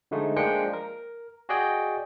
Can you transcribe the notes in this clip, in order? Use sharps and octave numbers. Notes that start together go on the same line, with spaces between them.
D3 F3 G#3 A3 D#4
F3 G#3 A#3 D4 G5 C#7
A#4
F#4 G#4 D5 D#5 G5 G#5